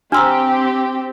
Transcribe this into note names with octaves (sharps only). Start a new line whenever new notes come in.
C4 D4 G4 A#5 C6 E6 F6